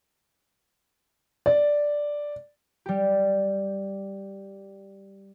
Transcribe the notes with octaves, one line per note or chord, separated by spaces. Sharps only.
D5
G3 G4